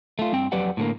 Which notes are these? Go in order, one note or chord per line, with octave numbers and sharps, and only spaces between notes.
A3 F4
G2 C4 G5
F2 F#3 G4 B4 D5 F#5
A2 D3 A#3